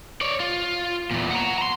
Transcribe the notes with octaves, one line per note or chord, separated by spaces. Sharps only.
C#5 D5
F4
E2 A#2
F#5 A#5
A#5 C6